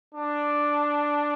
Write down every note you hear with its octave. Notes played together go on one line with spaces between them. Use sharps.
D4